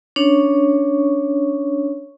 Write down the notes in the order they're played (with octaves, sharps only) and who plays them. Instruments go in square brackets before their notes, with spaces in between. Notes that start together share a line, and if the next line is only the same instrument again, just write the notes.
[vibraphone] C#4 D4 C#5 C#6